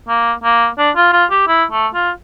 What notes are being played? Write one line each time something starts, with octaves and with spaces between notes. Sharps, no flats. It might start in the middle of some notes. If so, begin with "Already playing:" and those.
A#3
A#3
D4
F4
F4
G4
E4
A3
F4